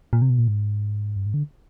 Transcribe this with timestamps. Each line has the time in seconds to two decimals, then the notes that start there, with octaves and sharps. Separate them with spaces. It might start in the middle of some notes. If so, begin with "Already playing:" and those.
0.13 A#2
0.22 C3
0.30 B2
0.39 A#2
0.48 G#2
1.16 G2
1.26 G#2
1.34 D3